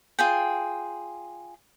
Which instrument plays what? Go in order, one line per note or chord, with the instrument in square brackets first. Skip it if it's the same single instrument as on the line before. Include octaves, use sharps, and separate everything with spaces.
[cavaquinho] F4 G#4 G5